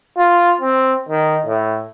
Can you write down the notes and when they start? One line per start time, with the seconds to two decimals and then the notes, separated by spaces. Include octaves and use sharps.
0.18 F4
0.61 C4
1.09 D#3
1.46 A2